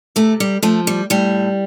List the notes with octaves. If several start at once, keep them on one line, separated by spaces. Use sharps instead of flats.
C3 A3
G3
F3 A3
G3
A2 G3